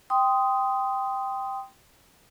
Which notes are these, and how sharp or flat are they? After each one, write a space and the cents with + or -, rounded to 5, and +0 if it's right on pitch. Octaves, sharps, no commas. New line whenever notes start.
G5 +0 C6 -15 D#6 +5